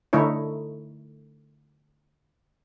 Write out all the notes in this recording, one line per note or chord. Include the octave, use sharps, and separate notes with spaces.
D3 A3 D#4 E4 C#5